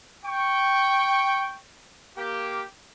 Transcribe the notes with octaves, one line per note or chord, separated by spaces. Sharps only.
G5 C#6
A#3 G4